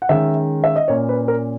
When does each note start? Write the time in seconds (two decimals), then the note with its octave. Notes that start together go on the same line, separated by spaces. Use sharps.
0.02 F#5
0.09 D#3 G#3 C#4 E5
0.64 E5
0.76 D#5
0.88 A#2 A#3 C#4 C#5
1.09 B4
1.28 A#4